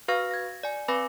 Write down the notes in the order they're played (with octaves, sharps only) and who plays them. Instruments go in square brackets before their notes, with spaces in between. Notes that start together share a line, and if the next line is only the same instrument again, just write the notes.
[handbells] F#4 B4 F5 C#6 F6 A#6
G#6 A#6
D5 G#5
C4 B4 G#5 B5 D6 A#6